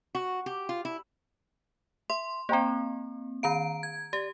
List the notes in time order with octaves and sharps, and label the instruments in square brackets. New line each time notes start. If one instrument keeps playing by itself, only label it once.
[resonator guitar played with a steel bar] F#4
G4
F4
E4
[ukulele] E5 [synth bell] C6
[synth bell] A#3 C4 [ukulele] C5 G5 A#5
[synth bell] D#3 A#5 D7 [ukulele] F5
[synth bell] G#6
[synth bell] G4 [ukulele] D5